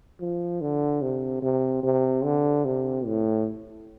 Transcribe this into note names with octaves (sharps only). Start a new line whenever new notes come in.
F3
D3
C3
C3
C3
D3
C3
A2